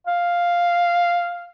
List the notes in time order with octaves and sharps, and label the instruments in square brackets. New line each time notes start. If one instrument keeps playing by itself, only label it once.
[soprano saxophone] F5